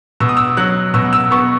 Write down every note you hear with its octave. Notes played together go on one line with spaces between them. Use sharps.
B2 E6
D#6
E6
F#3 F#6
B2 E6
E6
B3 C#6